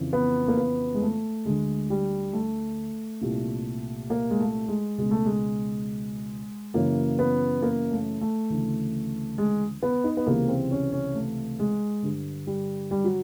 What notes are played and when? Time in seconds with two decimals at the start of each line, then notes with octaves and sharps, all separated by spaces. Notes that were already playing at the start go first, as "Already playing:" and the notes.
Already playing: F2 C#3 E3
0.13 B3
0.48 A#3
0.57 B3
0.95 G#3
1.02 A3
1.45 D2 D3 G#3
1.90 G3
2.33 A3
3.21 C2 A#2
4.10 A#3
4.30 G#3
4.39 A3
4.68 G#3
4.98 C#2 B2 G#3
5.11 A3
5.26 G#3
6.74 F#2 C#3 E3 A#3
7.19 B3
7.62 A#3
7.91 A3
8.21 A3
8.50 D2 C#3 E3
9.38 G#3
9.83 B3
10.04 D#4
10.17 B3
10.26 C#2 C3 E3 A#3
10.48 C4
10.71 C#4
10.92 C#4
11.14 A3
11.59 G#3
12.03 G2 D3
12.47 G3
12.91 G3
13.04 F#3